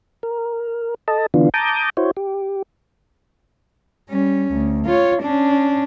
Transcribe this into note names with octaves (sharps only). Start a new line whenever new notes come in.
A#4
A4 D#5 A5
D3 E3 B3 D4 F4
A5 A#5 D6 D#6 G6
E4 F#4 C5 C#5
G4
G3 C#4
D2
F4 C#5
C#4 D4